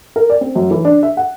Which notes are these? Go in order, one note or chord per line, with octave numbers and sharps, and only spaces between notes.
A#4
D5
C4
F#2
E3
D4
E5
F#5